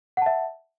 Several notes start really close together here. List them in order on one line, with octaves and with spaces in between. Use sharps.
F#5 A5 E5